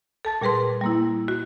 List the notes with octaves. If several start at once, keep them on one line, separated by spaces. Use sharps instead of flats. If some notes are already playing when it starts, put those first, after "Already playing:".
A4 A5 A6
A#2 G3 G#4 B4 C6
G3 A#3 E4
F#4